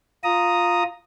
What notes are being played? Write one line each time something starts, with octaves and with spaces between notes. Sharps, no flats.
F4 A#5 D#6